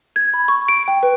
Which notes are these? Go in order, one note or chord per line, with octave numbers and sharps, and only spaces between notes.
G#6
B5
C#6
D7
G5
B4